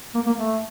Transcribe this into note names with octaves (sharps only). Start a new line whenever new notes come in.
A#3
A#3
A3